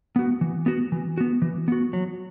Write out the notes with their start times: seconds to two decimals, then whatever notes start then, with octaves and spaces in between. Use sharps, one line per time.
0.16 B3 F#4
0.41 E3
0.66 B3 F#4
0.92 E3
1.18 B3 F#4
1.42 E3
1.68 B3 F#4
1.93 F#3